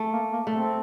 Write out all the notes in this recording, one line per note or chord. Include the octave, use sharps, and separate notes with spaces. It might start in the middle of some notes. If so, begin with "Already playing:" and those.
Already playing: A3
A#3
A#3
A3
C4